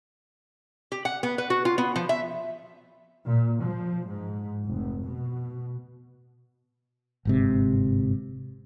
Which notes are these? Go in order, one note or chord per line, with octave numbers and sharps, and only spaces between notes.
G4
F#5
B3
B4
F#4
F4
B3
F3
E5
A#2
F3
G#2
F1
B2
G1 G#2 C3